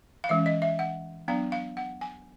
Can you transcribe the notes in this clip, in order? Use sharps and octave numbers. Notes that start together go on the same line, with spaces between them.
F5
E3 G#3 C#4 E5
D#5
E5
F#5
F#3 B3 D4 F5
F5
F#5
G#5